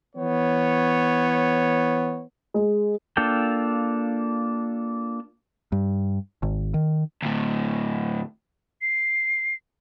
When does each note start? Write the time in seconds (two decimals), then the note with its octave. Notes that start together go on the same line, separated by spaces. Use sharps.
0.16 E3 B3 C#5
2.54 G#3
3.17 A#3 D4 F4 A4 G5
5.72 G2
6.43 G#1
6.74 D#3
7.22 D2 A2
8.82 C7